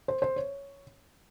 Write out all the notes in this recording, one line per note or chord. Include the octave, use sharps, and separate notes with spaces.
C5
C5
C#5